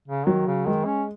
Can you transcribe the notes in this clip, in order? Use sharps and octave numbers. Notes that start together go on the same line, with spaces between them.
C#3
D#3 F#3
C#3
D#3 G#3
C#4